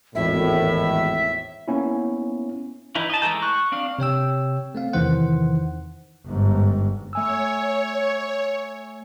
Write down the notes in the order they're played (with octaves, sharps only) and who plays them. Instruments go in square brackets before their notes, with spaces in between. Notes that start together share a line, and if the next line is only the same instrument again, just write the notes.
[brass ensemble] G#1 E2 A2 [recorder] E5
[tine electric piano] A#3 B3 C#4 E4
[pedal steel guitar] E3 D#4 E4
D#5 A5
E3 G#3 A3 A#5 G6
C#6 F#6
C4 D4 F5
[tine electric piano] C3 C#5 G5 E6
A3 C4 F5
E2 C3 D#3 E3 C5 F#5
[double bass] G1 G#2
[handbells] A3 G#5 E6 [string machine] C#5